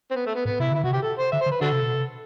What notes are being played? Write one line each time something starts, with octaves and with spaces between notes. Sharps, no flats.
C4
B3
A3
B3
A2 B3
C3 E4
D3 E4
C3 F#4
G4
A4
C5
D3 E5
C5
D3
B4
D3 D4 F#4 A4
C3
B2
C3